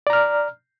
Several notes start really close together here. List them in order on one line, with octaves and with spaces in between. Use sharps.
D5 A#5 F6